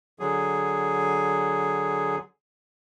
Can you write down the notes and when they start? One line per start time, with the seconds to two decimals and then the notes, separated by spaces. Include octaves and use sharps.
0.19 D3 F#3 G#4